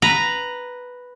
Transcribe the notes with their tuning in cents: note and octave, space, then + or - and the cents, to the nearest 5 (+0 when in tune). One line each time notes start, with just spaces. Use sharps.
B4 +0 A#5 +0